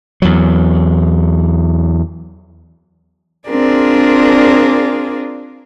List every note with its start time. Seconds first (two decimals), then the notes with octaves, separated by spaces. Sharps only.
0.22 E2 F#3
3.47 C4 D4 F4 G#4 A#4 D5